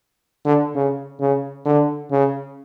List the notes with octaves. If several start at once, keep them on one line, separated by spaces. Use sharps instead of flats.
D3
C#3
C#3
D3
C#3